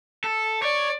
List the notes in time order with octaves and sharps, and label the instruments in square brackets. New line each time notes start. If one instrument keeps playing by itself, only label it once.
[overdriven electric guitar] A4
[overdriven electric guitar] C#5 [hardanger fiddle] D5